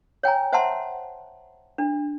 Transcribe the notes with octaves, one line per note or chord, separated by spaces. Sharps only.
C#5 G5 G#5 A#5
C5 E5 F#5 A5 A#5 C6
D4